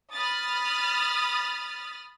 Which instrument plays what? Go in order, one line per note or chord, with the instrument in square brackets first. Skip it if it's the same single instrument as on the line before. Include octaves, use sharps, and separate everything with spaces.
[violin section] B5 D#6 F6 A6